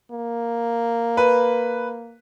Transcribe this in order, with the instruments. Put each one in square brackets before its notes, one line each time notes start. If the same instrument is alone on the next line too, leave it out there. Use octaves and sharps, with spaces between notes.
[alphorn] A#3
[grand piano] B4